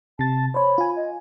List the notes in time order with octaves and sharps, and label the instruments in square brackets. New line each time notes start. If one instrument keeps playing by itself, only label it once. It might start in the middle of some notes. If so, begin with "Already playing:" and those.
[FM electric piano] C3 A6 [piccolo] A5
[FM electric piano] C5 C#5 [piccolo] B5
[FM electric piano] F4 G#5
[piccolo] D#5